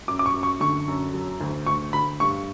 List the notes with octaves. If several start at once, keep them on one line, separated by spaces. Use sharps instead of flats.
F#2 D6
D6
C#6
F#2
C#6
D3 C#6
F#2
F#3
D2
D2 C#6
D2 B5
G2 C#6